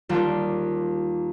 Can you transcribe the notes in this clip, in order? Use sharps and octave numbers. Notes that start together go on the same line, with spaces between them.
D#2 G3 F4 A5 D6